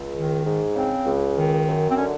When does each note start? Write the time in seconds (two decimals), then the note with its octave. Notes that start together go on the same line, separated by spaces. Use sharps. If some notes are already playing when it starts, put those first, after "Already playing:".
Already playing: C#2
0.16 D#3
0.46 G#2
0.76 C#3 C4
1.06 C#2
1.37 D#3
1.67 F#2
1.91 C4
1.96 D3 C#4